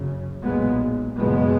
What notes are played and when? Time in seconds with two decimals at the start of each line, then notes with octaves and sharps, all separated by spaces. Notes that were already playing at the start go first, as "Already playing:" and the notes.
Already playing: F#1 F#2 C#3
0.42 B1 A#2 G#3 B3
1.17 F#1 E2 B2 G#3 B3